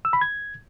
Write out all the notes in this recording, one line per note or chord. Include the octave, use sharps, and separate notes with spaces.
E6
B5
G#6